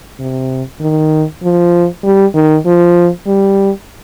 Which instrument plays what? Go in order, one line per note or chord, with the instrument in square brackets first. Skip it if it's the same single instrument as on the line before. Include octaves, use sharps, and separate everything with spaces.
[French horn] C3
D#3
F3
G3
D#3
F3
G3